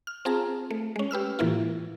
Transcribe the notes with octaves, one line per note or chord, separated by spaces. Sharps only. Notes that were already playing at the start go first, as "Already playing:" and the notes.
F6
C4 F4 G#4 A5 A#5
A3
G#3 C#4
G4 B4 E6 F6
A2 E3 A#3 E4 F4